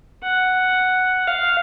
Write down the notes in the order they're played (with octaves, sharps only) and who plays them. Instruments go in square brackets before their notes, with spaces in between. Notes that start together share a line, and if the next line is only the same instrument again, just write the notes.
[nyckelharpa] F#5
[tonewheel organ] F5